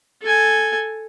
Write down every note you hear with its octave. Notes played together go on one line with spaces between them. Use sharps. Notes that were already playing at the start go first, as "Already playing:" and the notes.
A4 G#5